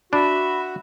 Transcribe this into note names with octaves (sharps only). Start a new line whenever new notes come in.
D4 F#4 E5 B5